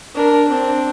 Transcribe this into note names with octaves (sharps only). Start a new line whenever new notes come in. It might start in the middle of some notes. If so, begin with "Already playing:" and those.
D4 A#4
C4 D4